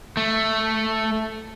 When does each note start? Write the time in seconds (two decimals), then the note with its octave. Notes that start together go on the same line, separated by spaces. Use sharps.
0.17 A3